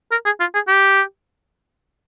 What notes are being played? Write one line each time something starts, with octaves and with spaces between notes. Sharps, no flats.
A#4
G#4
F4
G#4
G4